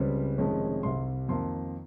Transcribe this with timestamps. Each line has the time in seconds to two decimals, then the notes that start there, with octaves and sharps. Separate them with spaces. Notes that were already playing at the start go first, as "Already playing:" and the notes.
Already playing: C#2 C#3 G3 C4
0.38 F1 F2 D#3 G#3 C#4
0.83 C2 C3 G3 C6
1.29 F2 D#3 A#3 C6